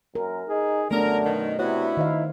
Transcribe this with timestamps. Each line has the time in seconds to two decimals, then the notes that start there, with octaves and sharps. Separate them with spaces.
0.15 F#2 A#4
0.49 D#4 G#4
0.91 F#2 D3 A3 B3 D4 A#4
1.25 B2 D#3
1.59 C3 B3 D4 E4 F#4 C#5
1.97 D#3 D#4 C5 F5